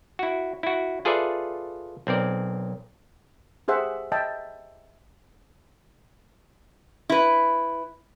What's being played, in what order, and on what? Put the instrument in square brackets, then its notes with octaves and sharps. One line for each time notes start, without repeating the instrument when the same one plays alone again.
[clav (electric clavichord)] E4 F#4
E4 F#4
F4 G#4 A4 B4 D5 E5
B1 C4 A#4 D5
[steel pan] G4 G#4 C5 E5 F#5
D#5 E5 G5 A5
[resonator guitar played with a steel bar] E4 B4